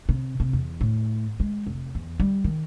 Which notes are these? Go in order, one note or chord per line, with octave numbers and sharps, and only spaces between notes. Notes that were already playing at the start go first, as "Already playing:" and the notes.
C3
C3
E2
A2
G#3
F1
E2
G3
D#3